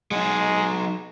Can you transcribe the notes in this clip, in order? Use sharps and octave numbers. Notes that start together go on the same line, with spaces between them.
F#3 G#3 D#4